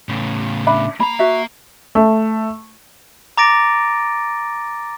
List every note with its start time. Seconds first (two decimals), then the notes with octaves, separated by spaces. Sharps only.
0.09 A2 C#3
0.66 D4 E5 B5
1.00 A#3 A#5 B5
1.19 F#4 E5
1.95 A3
3.37 A#5 D6 A6 A#6 D7